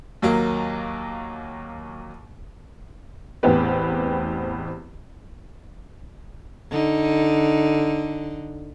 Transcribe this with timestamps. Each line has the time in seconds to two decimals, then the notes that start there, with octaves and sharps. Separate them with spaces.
0.22 D#2 F#3 A#3
3.43 A1 E2 B3 C4 G4 B4
6.71 D3 D#4